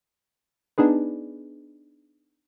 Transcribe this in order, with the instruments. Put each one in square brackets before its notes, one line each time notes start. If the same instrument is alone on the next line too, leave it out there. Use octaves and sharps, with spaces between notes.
[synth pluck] B3 D4 D#4 G#4 B4